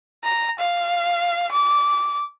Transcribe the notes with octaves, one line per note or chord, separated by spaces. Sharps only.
A#5
F5
D6